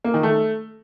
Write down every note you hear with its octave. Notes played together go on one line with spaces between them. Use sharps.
A#3
D#3
A3